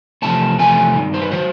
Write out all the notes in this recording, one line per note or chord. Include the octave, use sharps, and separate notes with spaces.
E2 C3 F3 A3 C#4 A5
E2 C3 F3 A3 C#4 G#5
G2 D#3
C5
B4
D#3 F#3 C5